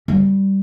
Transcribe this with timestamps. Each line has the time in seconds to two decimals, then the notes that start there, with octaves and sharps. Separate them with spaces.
0.08 G3